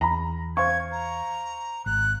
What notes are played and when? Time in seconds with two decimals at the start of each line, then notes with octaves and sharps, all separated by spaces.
0.01 E2 A#5 B5
0.57 C5 F5 C#6 G#6
0.92 A#5
1.86 G#1 F#6